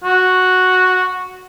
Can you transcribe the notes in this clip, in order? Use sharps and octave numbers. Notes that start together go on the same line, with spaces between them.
F#4